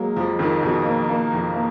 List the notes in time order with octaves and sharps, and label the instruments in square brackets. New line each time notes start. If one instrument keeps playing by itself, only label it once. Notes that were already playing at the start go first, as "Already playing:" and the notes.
Already playing: [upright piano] F#3 G#3 [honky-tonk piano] A#3
[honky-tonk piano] F2 [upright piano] F3
[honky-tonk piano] F2 [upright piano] D#3
[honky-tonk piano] F2 [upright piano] B2
[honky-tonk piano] A#3
A#3
F2
A#3